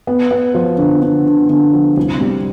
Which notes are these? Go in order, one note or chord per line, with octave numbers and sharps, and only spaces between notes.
B3
B3
F3
D3
D3
D3
D3
F3
C2
G3